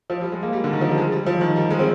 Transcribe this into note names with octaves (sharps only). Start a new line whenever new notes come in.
F3
G3
G#3
A#3
G3
D3
D#3
F3
G3
G#3
G3
F3
D#3
G3
G#3
C4